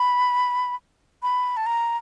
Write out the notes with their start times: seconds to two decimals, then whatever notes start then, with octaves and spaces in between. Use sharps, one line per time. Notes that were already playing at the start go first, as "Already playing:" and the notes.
Already playing: B5
1.23 B5
1.57 A5
1.66 A#5